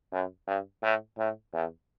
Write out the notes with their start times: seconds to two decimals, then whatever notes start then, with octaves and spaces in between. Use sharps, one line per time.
0.13 F#2
0.47 G2
0.83 A2
1.18 A2
1.53 E2